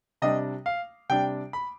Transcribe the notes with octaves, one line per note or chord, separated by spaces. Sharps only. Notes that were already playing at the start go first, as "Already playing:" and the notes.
C3 G3 D4 D#5
F5
C3 G3 D4 G5
B5